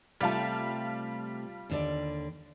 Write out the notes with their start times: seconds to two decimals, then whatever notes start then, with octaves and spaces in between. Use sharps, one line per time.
0.21 C3 G3 A3 F4 A5
1.70 D#2 D3 D5